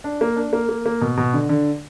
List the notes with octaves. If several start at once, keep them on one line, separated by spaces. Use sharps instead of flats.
D4
A#3
D4
A#3
A#3
A#3
B2
B2
D3
D3